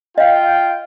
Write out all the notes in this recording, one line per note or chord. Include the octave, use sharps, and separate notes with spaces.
F4 D#5 F5 G5